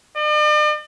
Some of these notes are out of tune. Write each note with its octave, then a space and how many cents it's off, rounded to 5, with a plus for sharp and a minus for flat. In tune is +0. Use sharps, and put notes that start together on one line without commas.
D5 +45